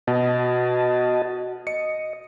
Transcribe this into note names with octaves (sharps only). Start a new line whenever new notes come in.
B2 F#4 D#5 A5
D#5 C#7